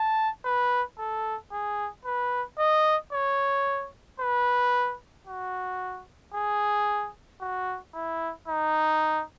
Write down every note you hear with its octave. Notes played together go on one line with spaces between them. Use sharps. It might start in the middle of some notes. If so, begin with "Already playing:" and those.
Already playing: A5
B4
A4
G#4
B4
D#5
C#5
B4
F#4
G#4
F#4
E4
D#4